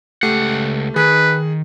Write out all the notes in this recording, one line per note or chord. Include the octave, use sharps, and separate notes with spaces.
C#2 A3 G4 F#5 C7
D#3 G#4 B4